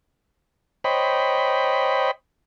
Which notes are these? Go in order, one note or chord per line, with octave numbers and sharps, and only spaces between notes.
C5 C#5 D#5 G5 B5